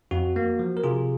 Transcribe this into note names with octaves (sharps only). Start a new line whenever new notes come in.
F2 F#4
A#3
F3
A#4
C3 F4 G#4